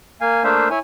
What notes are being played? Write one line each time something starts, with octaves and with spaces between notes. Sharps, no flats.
A#3 F5 G#5
A3 A#3 D4 C5 E5 F5
E4 C#5 G#5